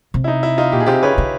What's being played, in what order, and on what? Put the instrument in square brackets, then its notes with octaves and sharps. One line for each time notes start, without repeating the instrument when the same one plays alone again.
[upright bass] C3
[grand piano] E4
D#4
E4
D#4 F4
[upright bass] A#2 [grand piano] G4
[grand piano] G#4
[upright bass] C3 [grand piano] F4 G4
[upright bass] C#3 [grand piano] B4 C#5
[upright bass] C#3